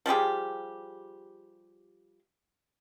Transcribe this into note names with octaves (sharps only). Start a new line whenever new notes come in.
F3 G3 G4 G#4